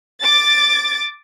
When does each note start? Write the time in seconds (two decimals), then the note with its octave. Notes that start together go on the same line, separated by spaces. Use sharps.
0.21 D6 A6